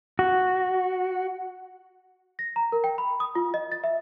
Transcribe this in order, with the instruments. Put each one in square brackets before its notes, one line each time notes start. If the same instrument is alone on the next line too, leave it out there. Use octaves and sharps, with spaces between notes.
[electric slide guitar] F#4
[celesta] A#6
A#5
A#4
G5
B5
D#6
F4
D#5
A6
E5